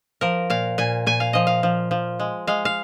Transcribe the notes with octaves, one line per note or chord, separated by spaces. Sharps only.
F3 A#4
A#2 F5
A#2 G#5
A#2 G#5
F5
F3 D#5
F5
F3
F3
G#3
G#3 F5
F5